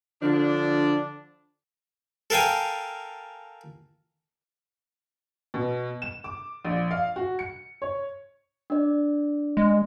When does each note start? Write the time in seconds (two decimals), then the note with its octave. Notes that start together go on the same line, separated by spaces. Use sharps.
0.21 D3 F3 D4
2.30 A4 A#4 F5 G5 G#5
5.54 B2
6.02 E7
6.24 D6
6.65 A#1
6.91 F5
7.16 F#4
7.39 C#7
7.82 C#5
8.70 D4 D5
9.57 G#3